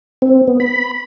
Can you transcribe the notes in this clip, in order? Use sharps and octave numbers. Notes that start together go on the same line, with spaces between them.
C4
B3
B5